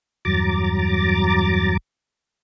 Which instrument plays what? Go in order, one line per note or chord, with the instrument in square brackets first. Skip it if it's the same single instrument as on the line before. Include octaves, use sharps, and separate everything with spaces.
[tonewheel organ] E2 G2 F#3 A#5 D6 A6